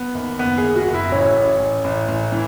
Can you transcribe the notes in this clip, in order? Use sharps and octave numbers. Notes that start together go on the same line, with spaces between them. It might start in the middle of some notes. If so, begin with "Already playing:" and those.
Already playing: B3
D#2
F#1 B3
G#4
F#1
F#4
F#1
E4
A1 C#4
A1
A1
A1
A1
E3